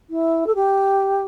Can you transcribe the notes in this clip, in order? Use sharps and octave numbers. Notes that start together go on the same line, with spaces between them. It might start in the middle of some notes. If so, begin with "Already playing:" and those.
E4
A4
G4